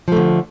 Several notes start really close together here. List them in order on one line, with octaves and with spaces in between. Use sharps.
F3 A3 D3